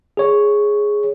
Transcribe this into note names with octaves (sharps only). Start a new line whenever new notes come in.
G#4 C#5